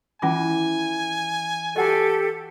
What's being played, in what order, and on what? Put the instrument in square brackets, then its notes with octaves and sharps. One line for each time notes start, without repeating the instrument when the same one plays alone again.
[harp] E3 [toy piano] C#4 F4 D6 [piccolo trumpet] G#5
[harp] F#4 [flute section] G4 A4 [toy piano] D#5 F#5 A5